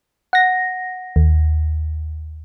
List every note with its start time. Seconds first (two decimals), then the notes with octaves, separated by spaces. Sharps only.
0.33 F#5 A#6
1.16 D#2